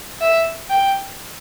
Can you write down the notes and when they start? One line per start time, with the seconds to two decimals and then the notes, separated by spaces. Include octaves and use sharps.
0.21 E5
0.70 G5